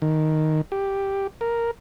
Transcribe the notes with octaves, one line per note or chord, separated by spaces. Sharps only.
D#3
G4
A#4